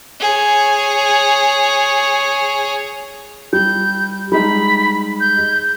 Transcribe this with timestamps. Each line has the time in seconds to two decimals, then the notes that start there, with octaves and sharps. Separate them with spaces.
0.20 G#4 C#5
3.53 G3 G6
4.32 G3 G#3 D#4 B5
5.20 G6